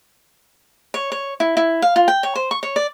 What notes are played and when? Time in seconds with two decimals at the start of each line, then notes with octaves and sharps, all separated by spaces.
0.94 C#5
1.12 C#5
1.40 E4
1.57 E4
1.82 F5
1.96 F4
2.08 G5
2.23 C#5
2.35 C5
2.51 C#6
2.63 C#5
2.76 D5